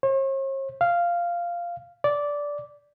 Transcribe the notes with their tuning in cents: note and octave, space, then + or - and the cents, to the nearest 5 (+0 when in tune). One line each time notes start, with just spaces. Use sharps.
C#5 -45
F5 -5
D5 -10